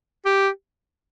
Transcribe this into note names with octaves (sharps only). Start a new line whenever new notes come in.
G4